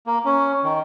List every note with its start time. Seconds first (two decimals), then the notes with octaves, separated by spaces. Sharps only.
0.07 A#3
0.25 C#4
0.64 D#3